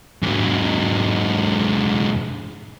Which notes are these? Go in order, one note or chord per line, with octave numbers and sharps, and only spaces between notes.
G#2 F#3